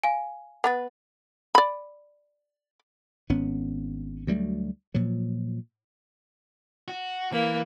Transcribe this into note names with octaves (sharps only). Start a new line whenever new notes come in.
F5 G#5
B3 B4 F#5 A6
D5 B5
G#1 B3 C#4
D2 F#3 G3 A3
A#2 F3 F#3
F#4
E3 A#3